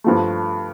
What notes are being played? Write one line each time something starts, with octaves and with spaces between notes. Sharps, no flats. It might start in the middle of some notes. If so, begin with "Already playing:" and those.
G2 F3 A3